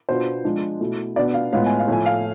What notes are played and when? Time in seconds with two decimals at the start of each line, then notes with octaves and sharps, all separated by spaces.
0.08 B2 B3 D4 F4 C5
0.44 F3 G#3 D4 F4
0.80 B2 A3 E4
1.16 B2 B3 D4 D5
1.34 F5
1.53 A2 G#3 B3 F4 F5
1.66 G#5
1.79 F5
1.88 A2 F3 A3 E4 G#5
2.06 F5